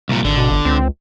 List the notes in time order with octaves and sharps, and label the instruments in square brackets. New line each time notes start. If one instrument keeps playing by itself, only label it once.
[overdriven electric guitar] C2 A#2
[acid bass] G#1 [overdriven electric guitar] D3
[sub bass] B2
G1
[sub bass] C#2 [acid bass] C4